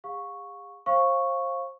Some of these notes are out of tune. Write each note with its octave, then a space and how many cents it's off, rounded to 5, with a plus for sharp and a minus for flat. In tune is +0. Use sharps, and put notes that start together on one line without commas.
G#4 -45 F5 +35 C#6 +0
C5 +35 F5 +0 C#6 +0